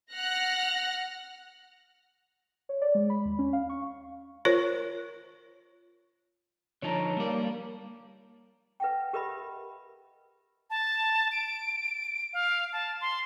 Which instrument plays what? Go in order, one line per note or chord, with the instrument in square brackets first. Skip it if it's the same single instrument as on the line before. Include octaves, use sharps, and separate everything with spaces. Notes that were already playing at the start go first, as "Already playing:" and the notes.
[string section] F#5 F6 F#6 A#6
[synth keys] C#5
D5
G#3
B5
D#2
C#4
F5
C#6
[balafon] F4 A#4 C5 C#5
[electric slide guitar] D3 F3 D#4 [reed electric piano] C#5 A5 A#5
[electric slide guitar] G3 D5 [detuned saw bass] A#3
[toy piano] B4 E5 F#5 G5
G4 A#4 B4 D#5 E5 B5
[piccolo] A5
D7
F5
A5
C6